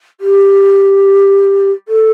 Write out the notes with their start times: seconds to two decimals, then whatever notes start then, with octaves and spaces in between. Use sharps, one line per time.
0.20 G4
1.88 A4